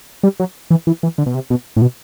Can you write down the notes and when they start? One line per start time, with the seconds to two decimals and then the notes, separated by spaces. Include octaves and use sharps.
0.23 G3
0.40 F#3
0.70 E3
0.87 E3
1.03 E3
1.18 D3
1.26 B2
1.34 C3
1.50 B2
1.76 A2
1.82 B2